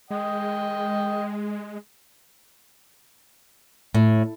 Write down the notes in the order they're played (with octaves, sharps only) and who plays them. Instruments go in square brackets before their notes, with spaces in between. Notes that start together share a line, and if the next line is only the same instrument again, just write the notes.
[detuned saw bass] G#3 [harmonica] D#5 G5
[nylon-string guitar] A2